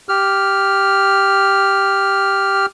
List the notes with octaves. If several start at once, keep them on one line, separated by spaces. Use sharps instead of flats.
G4 F6